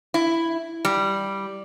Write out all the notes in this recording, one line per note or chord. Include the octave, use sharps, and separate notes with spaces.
E4
G3